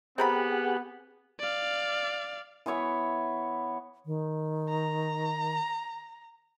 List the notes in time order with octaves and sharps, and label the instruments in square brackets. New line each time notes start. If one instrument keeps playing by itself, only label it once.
[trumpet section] B3 [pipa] C4 A#4 B5 [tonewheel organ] G4 G#4 F#5
[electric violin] D5 F5
[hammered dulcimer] E3 B3 C#5 E5
[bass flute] D#3
[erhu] A#5